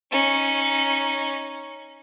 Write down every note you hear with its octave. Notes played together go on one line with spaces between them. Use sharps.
C#4 D#4